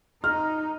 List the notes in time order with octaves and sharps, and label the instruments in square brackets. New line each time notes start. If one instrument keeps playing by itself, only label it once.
[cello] D#4 [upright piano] F6